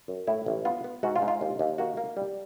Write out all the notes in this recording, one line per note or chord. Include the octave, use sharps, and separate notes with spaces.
F#2
A2 E4
A1
B3 F4
B3
G#2 F#4
F4
G#2
F4
D#2
D#2
A#3 F#4
A#3
G3